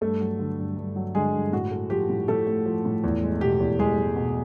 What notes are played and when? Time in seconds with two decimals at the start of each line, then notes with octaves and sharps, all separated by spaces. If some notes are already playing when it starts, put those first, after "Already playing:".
0.01 G2 A3 A4
0.20 F#3
0.39 D3
0.59 G2
0.77 G2
0.96 F#3
1.15 D3 G#3 G#4
1.34 G2
1.53 A2 F#4
1.71 A3
1.90 F3 G4
2.10 A2
2.28 A2 A3 A4
2.47 A3
2.66 F3
2.85 A2
3.04 E2
3.23 G#3
3.41 B2 G4
3.60 E2
3.79 E2 G#3 G#4
3.98 G#3
4.16 B2